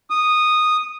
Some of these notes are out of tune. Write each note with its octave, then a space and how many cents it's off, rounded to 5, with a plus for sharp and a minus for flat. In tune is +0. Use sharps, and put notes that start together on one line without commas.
D#6 -10